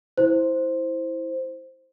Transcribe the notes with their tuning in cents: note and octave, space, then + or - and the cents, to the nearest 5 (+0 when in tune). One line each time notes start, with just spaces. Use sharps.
E4 -10 C5 +0